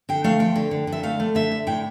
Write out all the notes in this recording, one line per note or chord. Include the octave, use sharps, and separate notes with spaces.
D3 G5
A3 F5
F3 G5
D3
D3
D3
E5
A3 F5
A3
D3 E5
D3
A2 G5